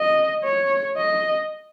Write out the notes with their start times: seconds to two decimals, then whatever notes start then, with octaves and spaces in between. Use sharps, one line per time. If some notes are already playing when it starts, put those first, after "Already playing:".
Already playing: D#5
0.44 C#5
0.97 D#5